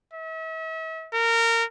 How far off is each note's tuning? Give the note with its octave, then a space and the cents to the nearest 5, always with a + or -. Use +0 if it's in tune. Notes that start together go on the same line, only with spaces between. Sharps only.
E5 -40
A#4 -20